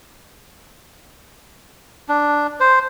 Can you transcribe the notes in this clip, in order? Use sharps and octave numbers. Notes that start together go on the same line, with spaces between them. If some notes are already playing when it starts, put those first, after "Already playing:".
D4
C5